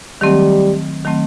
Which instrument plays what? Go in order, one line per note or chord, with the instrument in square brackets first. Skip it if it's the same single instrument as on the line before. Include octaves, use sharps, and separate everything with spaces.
[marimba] D#3 F#3 A3 C4 [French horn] G3
[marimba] D#3 F#3 A3 C4